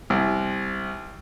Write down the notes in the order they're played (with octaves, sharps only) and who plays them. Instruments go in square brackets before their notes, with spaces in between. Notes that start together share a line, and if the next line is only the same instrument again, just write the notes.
[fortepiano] C2